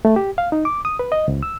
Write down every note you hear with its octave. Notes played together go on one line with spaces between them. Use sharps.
A3
G4
F5
D#4
D6
D#6
B4
D#5
C#2
E6